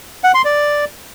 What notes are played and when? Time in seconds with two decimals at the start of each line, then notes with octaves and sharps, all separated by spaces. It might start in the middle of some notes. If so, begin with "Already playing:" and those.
0.24 F#5
0.34 C6
0.45 D5